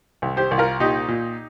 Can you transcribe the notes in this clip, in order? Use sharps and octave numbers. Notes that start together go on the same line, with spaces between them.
C2
G4 C5
C2
F4 A#4
A#2 D#4 G4
A#2